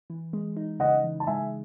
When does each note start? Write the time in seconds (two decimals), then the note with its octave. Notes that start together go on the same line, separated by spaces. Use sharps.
0.10 E3
0.33 G#3
0.57 D#4
0.79 C#3 D#5 F#5
1.04 E3
1.20 A5
1.27 G#3 E5 G#5